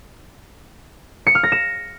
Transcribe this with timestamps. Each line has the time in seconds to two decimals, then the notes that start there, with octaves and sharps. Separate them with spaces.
1.27 C#7
1.35 F6
1.43 A#6
1.52 E7